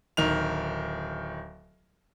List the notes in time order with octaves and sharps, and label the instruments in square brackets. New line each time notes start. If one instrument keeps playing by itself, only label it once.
[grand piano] D1 D#3 F7